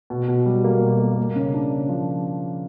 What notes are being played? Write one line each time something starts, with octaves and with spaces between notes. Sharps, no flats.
B2
B2
G3
A#3
B2
A#3
A#3
C#3
D4
C#3
F3